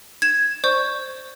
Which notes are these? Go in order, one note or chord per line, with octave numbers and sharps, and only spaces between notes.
G#6 E7
C5 D5 C#6 G6